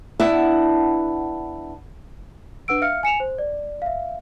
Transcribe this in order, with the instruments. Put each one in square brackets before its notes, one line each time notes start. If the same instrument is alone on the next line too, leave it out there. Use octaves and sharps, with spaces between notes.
[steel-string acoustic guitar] B3 D4 E4 F#5 A5
[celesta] D4 B4 F#5 E6 D7
E5 F5 F6 C#7
G#5 C#7 E7 F7
C5
D5
E5 F5